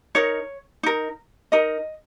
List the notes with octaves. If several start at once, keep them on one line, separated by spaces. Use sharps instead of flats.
D#4 A#4 C#5
D#4 A#4
D#4 A#4 D#5